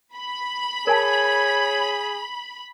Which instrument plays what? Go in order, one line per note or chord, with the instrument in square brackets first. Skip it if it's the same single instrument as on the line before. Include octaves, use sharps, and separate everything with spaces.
[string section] B5
[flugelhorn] G#4 [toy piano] A#4 G#5 A5 [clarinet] C#5